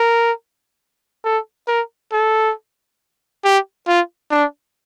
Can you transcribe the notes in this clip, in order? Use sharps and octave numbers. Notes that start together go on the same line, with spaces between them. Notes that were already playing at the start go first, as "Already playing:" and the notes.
Already playing: A#4
A4
A#4
A4
G4
F4
D4